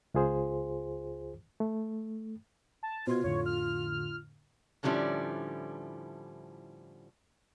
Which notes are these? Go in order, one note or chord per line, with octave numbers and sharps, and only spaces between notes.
C#2 F4 G#4 C5
A3
A5
B2 F4 C5 C6 G#6
F2 A2 D3 C#5
F6
A2 D3 F3 G3 C#4 E4